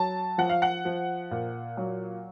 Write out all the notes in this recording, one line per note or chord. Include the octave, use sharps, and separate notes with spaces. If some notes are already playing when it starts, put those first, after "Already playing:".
Already playing: F#3 A5
F3 F#5
F5
F#5
F3
A#2
F#3